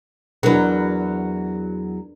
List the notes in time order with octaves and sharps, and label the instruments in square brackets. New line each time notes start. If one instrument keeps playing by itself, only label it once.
[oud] E2 F#3 [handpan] D4 A#4 B4